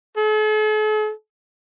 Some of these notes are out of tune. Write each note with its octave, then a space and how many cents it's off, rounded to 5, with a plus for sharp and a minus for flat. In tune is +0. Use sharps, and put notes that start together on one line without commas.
A4 -45